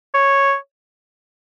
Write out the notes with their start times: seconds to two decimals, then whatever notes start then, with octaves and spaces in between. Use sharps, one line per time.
0.15 C#5